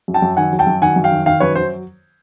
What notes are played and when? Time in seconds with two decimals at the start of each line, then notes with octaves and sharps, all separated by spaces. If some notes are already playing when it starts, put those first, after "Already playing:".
0.08 F#2
0.14 G5 A5
0.22 F#2
0.37 D#3 F#5 G#5
0.53 F#3
0.59 G5 A5
0.67 F#2
0.82 D#3 F#5 G#5
0.96 F#2
1.04 F5 G5
1.12 D#3
1.26 D#3 F5 G5
1.40 F#2 B4 C#5
1.55 F#3 C5